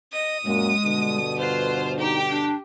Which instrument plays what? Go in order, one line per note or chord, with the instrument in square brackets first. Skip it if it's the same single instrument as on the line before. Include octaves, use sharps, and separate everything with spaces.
[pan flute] D#5 [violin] D#6
[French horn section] F#2 A#2 [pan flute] G#3
[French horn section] G2 B2 D3
[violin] F4 C5 [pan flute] B4
[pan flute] D#4 [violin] G4 G5
[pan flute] D4